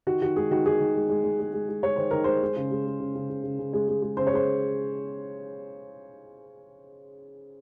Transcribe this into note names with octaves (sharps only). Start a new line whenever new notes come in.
D#3 F#4
D#3 F#4
G#3 G#4
D#3 F#4
D#3 G#4
D#3
G#3
G#3
G#3
G#3
G#3
G#3
G#3 C#5
D#3 C5
D#3 A#4
G#3 C5
G#3
C#3
G#3
G#3
C#3
C#3
C#3
C#3
C#3
G#3
G#3
G#3
C#3 C5
C#5
G#3 C5